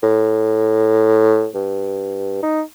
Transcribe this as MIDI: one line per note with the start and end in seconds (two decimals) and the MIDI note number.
0.03 1.48 45
1.54 2.40 43
2.43 2.61 63